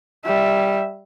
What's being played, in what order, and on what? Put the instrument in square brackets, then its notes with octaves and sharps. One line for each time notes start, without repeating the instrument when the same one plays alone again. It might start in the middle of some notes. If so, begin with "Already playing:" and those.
[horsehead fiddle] G3 E5